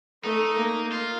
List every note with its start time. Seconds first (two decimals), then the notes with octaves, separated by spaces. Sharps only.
0.24 A3 D#4
0.58 A#3
0.92 F4